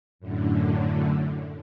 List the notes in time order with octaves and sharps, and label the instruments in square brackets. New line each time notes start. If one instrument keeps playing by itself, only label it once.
[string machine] F#2 A2 D3